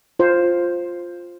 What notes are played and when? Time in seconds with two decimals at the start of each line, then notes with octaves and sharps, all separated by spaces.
0.19 F4 C5